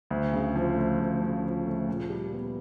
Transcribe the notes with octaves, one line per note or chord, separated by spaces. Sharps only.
D2
C#3
F3
A3
D2
C#3
F3
A3
A#2
G3
B3